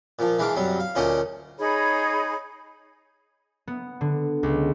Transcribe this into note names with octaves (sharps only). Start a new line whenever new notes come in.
A#2 F3
E3 G#3 D4 F5 D6
F#2 C3 F#3 G3
F5
D2 A#2 C#4 C5 D5 D#5
D#4 G#4 C#5 B5
B3
D3
C#2